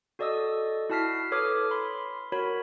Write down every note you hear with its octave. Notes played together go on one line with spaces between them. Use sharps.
F#4 A4 D5 D#5 D#6 E6
E4 F#4 A5 F6 B6 C7
A4 B4 C#5 D6 D#6 F6
B5 C6
F#4 A#4 C#5 B5